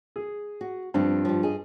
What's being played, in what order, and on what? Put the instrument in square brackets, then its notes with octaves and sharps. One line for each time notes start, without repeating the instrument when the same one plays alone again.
[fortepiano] G#4
[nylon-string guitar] F#4
[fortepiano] G2 [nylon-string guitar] F3 G3 C4
[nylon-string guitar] F3 G3
G#4 D#5